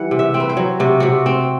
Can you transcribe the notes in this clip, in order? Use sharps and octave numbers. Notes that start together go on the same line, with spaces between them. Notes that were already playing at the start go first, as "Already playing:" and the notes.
Already playing: E3 G3 F#5
C3
E5
C4
B4
C5
F#3
C3 F#4
C3 F#4
C4